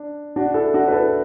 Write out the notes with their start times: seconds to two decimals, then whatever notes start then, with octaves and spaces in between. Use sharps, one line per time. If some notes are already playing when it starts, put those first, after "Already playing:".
Already playing: D4
0.36 D4 F#4
0.54 E4 A4
0.74 D4 F#4
0.88 B4
0.92 E4 A4